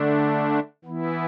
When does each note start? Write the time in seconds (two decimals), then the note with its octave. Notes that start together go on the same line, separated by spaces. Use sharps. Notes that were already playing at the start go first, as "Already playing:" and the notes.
Already playing: D3 A3 D4
0.84 E3 B3 E4